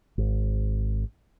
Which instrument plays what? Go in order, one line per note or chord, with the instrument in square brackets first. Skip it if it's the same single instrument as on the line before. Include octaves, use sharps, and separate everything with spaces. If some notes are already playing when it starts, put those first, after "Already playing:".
[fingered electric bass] G#1